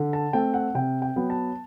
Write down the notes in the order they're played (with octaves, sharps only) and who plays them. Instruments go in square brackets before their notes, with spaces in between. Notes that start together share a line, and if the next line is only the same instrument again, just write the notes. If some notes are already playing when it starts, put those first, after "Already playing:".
Already playing: [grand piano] D3
A5
A3 C4 G5
F#5
C3 G5
G5
F#3 B3
A5